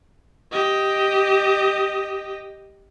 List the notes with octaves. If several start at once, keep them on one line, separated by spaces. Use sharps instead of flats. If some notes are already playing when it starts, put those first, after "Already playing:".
G4 D#5